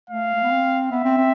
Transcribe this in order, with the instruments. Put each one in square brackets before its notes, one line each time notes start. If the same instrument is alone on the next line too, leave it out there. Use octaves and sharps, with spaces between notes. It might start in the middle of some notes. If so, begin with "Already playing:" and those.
[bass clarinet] A3 [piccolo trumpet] F5
[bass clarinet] A3
B3
C4
[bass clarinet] B3 [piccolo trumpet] E5
[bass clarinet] C4
C4